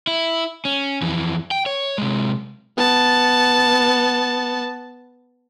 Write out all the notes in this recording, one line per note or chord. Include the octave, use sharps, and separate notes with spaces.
E4
C#4
F2 E3
G5
C#5
C3 G#3
B3 A5